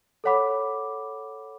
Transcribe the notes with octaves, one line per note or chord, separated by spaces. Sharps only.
A4 C#5 F#5 B5 D6